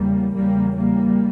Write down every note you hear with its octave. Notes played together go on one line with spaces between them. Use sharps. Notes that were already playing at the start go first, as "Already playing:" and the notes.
Already playing: E2 C#3 G3 A#3
E2 C#3 G3 A#3
G3 A#3